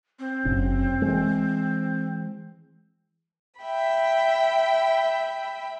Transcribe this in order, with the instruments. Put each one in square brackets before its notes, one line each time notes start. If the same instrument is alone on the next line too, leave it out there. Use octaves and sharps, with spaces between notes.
[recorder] C4
[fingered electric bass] F#1 C3 C#4
E3 G#3
[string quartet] E5 G5 B5